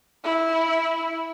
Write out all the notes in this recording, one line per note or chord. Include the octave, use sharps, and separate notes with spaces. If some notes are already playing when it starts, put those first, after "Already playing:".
E4